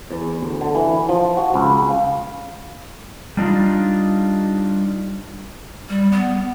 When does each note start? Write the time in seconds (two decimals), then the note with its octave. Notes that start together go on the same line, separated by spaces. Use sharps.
0.11 E2
0.41 D2
0.61 D3
0.75 E3
1.09 F3
1.37 F#4
1.54 C#2
1.89 F5
3.37 G3 D4 D#4 F4
5.89 G3
6.12 B3